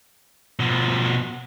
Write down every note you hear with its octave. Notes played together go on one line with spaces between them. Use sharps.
B2 F3